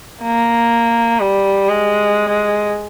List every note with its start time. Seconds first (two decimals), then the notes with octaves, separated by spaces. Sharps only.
0.23 A#3
1.20 G3
1.69 G#3